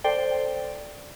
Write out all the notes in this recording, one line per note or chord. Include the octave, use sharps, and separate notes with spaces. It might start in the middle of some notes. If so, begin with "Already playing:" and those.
A4 C5 D5 G5